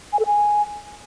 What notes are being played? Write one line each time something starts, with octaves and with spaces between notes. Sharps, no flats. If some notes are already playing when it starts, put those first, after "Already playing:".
G#5
A4
G#5